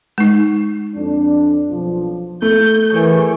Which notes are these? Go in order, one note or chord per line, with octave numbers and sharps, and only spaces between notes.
G#3 D#4
F2 D4
B1 F3
A3 G6
E3 G#4 A#4 C#5 G#5